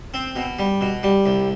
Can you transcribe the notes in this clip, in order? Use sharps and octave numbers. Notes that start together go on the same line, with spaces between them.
C4
B2
G3
B2
G3
C2